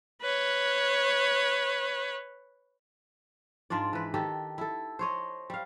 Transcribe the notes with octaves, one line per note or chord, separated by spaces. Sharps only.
B4 C#5
G#2 D4 F4 D5
E3 B4
D#3 G4 A4
E4 A4
C5 C#5 D#5
G3 F5